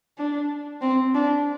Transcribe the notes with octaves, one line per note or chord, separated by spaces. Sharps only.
D4
C4
D4